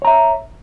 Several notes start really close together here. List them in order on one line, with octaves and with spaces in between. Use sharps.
C#5 A#5 E5